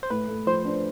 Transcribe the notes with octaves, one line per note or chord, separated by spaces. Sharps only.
C5
A2 B4
A3
F3 C5
D4